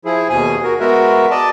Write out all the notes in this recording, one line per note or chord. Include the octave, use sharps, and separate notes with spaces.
F3 E4 G#4
D#2 B2 G#4 G#5
F#4 A#4
G#3 B3 F#4 A#4 E5
D5 D#5 A5